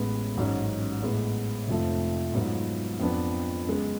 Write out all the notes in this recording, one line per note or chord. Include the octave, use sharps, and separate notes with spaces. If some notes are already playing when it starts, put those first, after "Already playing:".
Already playing: A1 A2 G#3 B3
A1 G#2 F#3 C#4
A2 G#3 B3
F1 F2 F3 A3
G#2 F#3 B3 F4
F2 F3 B3 D4
F#2 C#3 G#3 B3